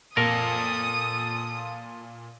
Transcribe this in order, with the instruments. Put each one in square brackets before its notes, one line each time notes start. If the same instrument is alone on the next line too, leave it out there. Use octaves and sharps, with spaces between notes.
[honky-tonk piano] A#2 [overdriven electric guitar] F4 A4 [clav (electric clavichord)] A#4 [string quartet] D#6